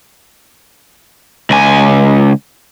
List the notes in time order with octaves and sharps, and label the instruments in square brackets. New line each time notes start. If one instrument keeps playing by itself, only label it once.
[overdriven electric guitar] C#2 G#5